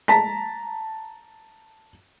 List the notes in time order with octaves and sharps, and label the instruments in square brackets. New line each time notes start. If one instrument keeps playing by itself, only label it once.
[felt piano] A5 A#5 B6